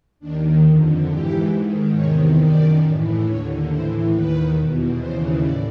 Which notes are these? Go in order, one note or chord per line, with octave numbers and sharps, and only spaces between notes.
D#2 D#3 D4
F2 D3
G#2 E3 G4
G#2
D#3
E2 C3 D#3 C#5
F#2 D#3 D5
A2 E3
D#2 D3 C#5
A2 E3 C5
D#2 D#3 B4
E2 B2
D#2 C#3 E3 C5
A2 D5